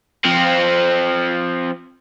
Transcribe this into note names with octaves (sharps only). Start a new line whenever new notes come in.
F3 C4